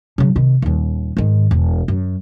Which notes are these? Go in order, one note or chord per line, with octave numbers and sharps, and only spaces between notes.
C#3 F#3
C3 D#3
D#1 D#2
G#2 D#3
E1
F#2